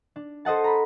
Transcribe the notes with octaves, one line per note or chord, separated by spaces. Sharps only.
D4
A4 C5 D#5 F#5 A5
A#5 B5